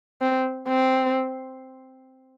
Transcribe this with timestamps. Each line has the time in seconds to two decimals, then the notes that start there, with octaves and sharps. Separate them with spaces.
0.22 C4
0.69 C4